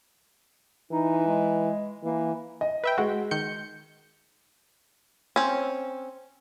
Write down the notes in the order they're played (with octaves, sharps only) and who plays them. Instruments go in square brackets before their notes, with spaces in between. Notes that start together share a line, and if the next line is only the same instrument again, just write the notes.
[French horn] E3 [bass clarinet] D#4
[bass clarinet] G#3
[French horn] E3 [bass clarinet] A#3
[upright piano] D#5
[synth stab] B4 E5 G5
[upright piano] G#3 [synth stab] F#4
[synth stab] D#3 G6 C#7
[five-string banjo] C4 C#4